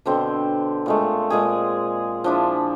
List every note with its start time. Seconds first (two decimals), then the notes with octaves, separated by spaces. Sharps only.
0.06 B2 D3 C4
0.86 A#2 G#3 A3
1.30 A#2 G#3 G#4
2.24 F3 D4 E4